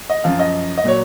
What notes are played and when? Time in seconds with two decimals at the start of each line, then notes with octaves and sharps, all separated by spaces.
0.10 D#5
0.24 F#2 F3 F5
0.39 D#5
0.78 D#5
0.84 A#2 F#3 C#5